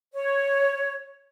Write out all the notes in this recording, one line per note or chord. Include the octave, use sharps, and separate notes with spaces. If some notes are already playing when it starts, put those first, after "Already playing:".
C#5